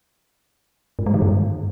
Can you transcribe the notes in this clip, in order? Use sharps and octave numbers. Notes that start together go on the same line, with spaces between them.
G#2
G#3
D#3
G2